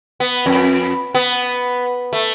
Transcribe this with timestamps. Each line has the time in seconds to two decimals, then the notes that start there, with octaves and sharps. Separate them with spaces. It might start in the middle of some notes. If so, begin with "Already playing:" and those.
0.20 B3
0.46 F2
1.15 B3
2.13 A3